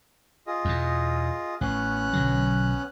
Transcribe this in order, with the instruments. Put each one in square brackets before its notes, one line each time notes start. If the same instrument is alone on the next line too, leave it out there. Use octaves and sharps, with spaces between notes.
[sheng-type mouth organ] F4 G#4 D#5
[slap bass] E2 B2
[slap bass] A1 [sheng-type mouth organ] B3 C#4 F#6
[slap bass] B1 D3 F#3